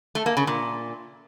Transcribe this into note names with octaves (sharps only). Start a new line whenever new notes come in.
A3
A#3
C#3
A#2